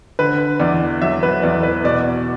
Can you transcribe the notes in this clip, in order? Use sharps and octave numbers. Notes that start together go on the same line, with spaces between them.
D3 B4
E2 D5
F#3 E5
B4
E2 D5
B4
B2 D5